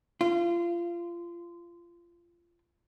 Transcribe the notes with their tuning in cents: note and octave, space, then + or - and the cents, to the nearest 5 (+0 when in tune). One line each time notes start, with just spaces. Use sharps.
F4 -25